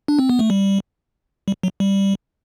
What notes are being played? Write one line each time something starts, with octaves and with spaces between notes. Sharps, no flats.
D4
C4
B3
A3
G3
G3
F#3
G3